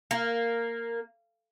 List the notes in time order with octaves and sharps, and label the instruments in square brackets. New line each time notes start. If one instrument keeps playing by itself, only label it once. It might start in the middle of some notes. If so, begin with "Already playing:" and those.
[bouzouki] A#3